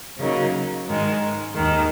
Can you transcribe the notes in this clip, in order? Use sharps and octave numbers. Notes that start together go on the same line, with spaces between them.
C#3 F#3 A#3 D#4
G#2 D#3 G#3 D#4
D#2 D#3 G#3